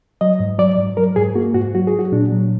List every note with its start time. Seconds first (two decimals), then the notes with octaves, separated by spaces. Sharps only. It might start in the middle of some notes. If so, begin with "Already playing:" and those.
0.21 F#3 D#5
0.40 G#2
0.59 F#3 D5
0.78 G#2
0.97 F#3 A#4
1.16 G#2 G#4
1.35 A#3 F#4
1.54 G#2 F#4
1.74 F#3 F#4
1.87 G#4
1.94 F#3 F#4
2.12 A#2 D4
2.32 F#3